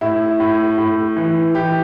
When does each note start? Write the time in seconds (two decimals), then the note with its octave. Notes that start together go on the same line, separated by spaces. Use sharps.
0.01 A2 E4
0.40 A2
0.78 A2
1.16 E3
1.55 E3 G4